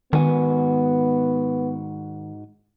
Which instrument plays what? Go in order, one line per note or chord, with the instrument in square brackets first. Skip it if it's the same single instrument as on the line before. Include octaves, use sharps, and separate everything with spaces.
[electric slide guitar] G#2 F#4 G#5 [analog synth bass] D#3 [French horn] B3